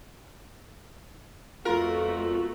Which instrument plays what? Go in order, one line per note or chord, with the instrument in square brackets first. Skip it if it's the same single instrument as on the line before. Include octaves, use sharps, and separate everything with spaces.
[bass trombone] F2 [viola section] A3 B3 F#4 [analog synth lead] F4 [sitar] A#4